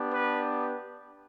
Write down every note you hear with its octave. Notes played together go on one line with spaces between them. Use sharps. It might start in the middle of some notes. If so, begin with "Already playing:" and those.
Already playing: B3 D4 G4
B4